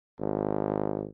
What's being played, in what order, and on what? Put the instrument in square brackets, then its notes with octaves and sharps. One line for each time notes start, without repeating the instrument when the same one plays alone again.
[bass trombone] G#1